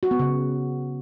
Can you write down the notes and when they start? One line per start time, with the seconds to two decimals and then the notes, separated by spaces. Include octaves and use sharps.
0.03 F#4
0.11 B3
0.19 C#3